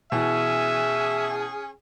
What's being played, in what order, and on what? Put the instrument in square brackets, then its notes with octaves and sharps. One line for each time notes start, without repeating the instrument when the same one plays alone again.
[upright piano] B2 E3 [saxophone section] C#4 G#4 [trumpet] E5